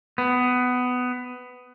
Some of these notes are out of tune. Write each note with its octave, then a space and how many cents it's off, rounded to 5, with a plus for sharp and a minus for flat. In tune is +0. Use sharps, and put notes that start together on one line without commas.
B3 +15